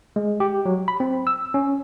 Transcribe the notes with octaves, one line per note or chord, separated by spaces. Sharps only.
G#3
G4
F#3
B5
C4
E6
C#4